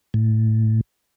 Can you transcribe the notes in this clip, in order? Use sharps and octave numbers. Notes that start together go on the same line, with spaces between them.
A2